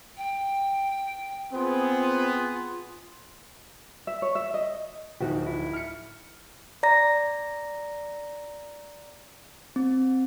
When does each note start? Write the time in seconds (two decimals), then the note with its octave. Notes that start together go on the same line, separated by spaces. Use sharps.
0.17 G5
1.53 B3 C4 F4 G#4
4.07 E5
4.22 C#5
4.35 E5
4.54 D#5
5.20 D1 F3 D#4 F#4 G4
5.46 E4
5.73 F6 C#7
6.83 D5 A#5 A#6
9.76 C4